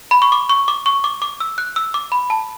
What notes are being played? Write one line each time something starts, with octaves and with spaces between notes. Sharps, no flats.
B5
C#6
D6
C#6
D6
C#6
D6
D6
E6
F#6
E6
D6
B5
A5